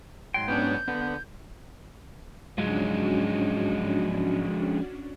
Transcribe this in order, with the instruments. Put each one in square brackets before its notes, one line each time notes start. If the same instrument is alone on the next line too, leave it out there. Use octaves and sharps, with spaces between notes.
[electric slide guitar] G#2 F#3 G5 [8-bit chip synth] C6
[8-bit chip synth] B3 C#4 D4 [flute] G6
[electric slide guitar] D3 [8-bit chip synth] B3
[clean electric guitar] G#2 F#3 [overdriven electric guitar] F3 G#3 [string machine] C#4 D4 F#4